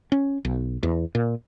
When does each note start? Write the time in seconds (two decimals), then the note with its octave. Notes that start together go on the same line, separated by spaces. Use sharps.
0.12 C#4
0.45 B1
0.83 E2
1.15 A#2